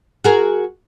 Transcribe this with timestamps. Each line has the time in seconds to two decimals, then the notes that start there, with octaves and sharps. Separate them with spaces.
0.24 F#4 G#4 A#4